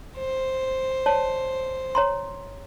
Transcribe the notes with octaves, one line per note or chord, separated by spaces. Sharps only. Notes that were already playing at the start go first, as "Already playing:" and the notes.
C5
C#5 D5 A5
C#5 A#5 C6